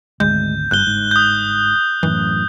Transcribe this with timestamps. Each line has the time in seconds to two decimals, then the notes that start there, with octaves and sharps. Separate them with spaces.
0.20 G#1 D2 G#3 G6
0.71 G1 G2 F#6 G7
0.87 G#2
1.11 D#6 G6
2.03 F#2 A2 E3